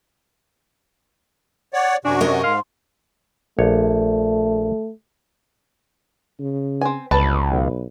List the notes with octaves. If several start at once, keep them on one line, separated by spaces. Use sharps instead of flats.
C#5 D5 F#5
F#2 C3 D4 F#4 G#5
A#4 D5 D#5 G#5
G#2 F5 C6
A#1 A3 C#5
C#3
C4 G#5
G1 C#2 B4 A5
B1